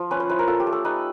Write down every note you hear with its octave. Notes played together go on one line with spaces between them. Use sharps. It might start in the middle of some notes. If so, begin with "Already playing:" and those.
Already playing: F3
C#4 B4
C5
E4 B4
A#4
F4 A4
G4
A3
A4
D#4 B4